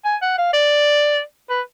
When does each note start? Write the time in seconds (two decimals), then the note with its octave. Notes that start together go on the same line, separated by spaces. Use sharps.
0.05 G#5
0.22 F#5
0.38 F5
0.53 D5
1.50 B4